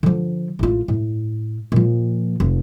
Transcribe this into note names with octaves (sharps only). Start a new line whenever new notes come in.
D3 F3
A1 F4
A2
A#2 F3
F1